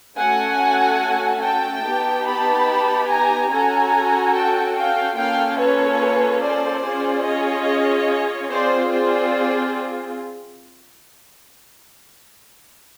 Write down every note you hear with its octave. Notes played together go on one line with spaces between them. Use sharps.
A3 C#4 F#4 A4 F#5 G#5
G5 A5
B3 D#4 G4
A5 B5
G#5 A#5
C#4 F#4 A4 G#5 A#5
G5 A5
F5 G5
A#3 C#4 F4 A4 F5 G5
B4 C#5
C5 D5
C#4 F4 G#4
C#5 D#5
C4 F4 G#4 C5 D5
C5 D5